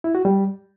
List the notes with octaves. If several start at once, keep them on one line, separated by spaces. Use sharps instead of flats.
E4
F#4
G3